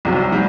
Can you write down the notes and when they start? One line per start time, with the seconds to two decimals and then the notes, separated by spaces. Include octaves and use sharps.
0.05 C2 C3 F#3
0.32 G3